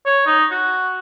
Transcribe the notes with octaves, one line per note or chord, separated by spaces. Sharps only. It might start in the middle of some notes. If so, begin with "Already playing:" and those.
C#5
D#4
F#4